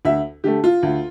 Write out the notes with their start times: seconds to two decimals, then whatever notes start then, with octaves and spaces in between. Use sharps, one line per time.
0.05 D2 E5
0.44 D3 A3 G4
0.64 F4
0.83 D2